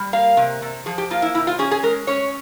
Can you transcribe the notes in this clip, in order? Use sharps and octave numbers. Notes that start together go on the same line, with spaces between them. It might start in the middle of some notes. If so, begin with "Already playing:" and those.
Already playing: G3
A#3 F5
C3
C3
F3 G#4
G4
A#3 F4
E4
C3 E4
F4
C#4 G#4
G#4
G#3 A#4
C#4 C#5